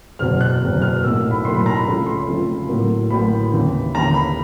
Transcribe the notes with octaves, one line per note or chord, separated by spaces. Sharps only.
F#1 E2 B2 F#3 F6
F#6
F#1 E2 B2 F#3
F6
B1 A2 F#3 A#3 E6
B5
B1 A2 F#3 A#3 C6
B5
A#5
B5
C#2 C#3 F3 A3 C#4 B5
C6
C#2 C#3 F3 A3 C#4
A1 A2 F#3 A#3
A1 A2 F#3 A#3 B5
D#2 C#3 E3
D#2 C#3 E3 A#5
B5